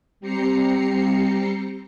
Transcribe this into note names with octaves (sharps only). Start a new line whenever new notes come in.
G3 C4 G4 A#5 C7 C#7